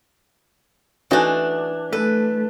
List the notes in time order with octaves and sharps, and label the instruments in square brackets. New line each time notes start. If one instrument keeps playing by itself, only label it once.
[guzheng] E3 D4 [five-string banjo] A3 D#4 F#4
[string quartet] A3 [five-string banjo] A4 [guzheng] B4